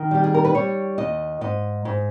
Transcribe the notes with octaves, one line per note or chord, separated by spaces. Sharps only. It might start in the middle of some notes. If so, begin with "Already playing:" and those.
Already playing: D#3
G3 G4
G#4
A#4
B4
G3 C#5
D#2 D#5
G#2 D#5
G#2